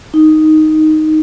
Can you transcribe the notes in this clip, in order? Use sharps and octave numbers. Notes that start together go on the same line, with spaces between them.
D#4